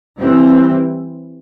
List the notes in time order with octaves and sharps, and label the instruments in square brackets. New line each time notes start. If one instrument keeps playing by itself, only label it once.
[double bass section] E3 G3 C4